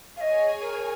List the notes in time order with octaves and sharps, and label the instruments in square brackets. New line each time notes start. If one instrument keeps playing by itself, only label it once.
[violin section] G#4 C#5 G#5 [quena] D#5 F5
[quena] A#4